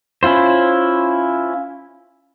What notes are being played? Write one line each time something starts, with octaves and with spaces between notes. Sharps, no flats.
C#4 E4 F4 C5